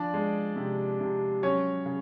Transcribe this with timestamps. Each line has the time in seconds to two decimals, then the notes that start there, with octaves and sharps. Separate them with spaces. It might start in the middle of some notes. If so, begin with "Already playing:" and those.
Already playing: F3 D4 D5
0.14 G#3
0.56 C3
1.00 C3
1.42 F#3 C#4 C#5
1.86 C#3